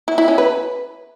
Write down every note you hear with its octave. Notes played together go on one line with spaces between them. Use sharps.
E4
E4
C#4
B4